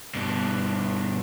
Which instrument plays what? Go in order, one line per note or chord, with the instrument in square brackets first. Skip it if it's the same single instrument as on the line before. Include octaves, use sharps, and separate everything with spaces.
[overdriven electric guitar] G2 B2